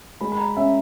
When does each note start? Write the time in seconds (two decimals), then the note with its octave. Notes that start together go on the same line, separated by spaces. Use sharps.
0.21 G#3 B5
0.32 B5
0.38 A#5
0.57 C#4 E5